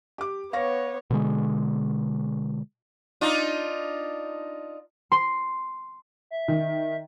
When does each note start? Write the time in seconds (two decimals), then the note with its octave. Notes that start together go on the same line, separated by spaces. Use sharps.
0.18 G4 D6
0.53 B3 C#5 F5 C#6 A#6
1.10 B2 D3 G#3
3.21 D4 D#4 F4
5.12 C6
6.31 E5
6.48 D#3